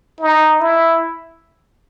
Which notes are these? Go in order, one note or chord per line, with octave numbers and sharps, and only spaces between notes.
D#4
E4